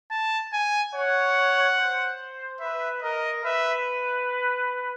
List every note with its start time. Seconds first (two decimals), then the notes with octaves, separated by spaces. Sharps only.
0.11 A5
0.53 G#5
0.94 C#5 F#5
1.77 C5
2.61 B4 E5
3.02 A#4 D#5
3.44 B4 E5